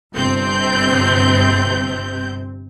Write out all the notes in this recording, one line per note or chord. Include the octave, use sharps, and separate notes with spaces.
G1 C3 C4 G6